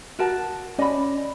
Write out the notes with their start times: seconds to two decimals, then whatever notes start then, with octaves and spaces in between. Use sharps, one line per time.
0.19 F#4 A#4 A5
0.79 C#4 D5 D#5 B5